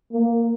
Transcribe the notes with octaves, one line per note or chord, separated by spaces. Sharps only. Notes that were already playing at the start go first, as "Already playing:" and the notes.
A#3